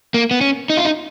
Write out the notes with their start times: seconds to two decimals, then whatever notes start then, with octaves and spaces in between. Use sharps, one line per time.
0.14 A#3
0.31 B3
0.41 C#4
0.70 D#4
0.77 F4
0.85 D#4